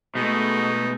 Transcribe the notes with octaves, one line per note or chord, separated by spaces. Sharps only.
B2 G#3 A3 D#4